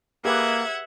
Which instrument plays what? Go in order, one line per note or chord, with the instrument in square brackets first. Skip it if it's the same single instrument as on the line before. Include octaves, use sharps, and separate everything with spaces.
[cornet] A#3 [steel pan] G4 G#4 B4 [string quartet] E5 F#5 G#6